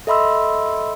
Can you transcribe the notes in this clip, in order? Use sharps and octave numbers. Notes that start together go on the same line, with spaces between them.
A4 D#5 E5 B5 C6 E6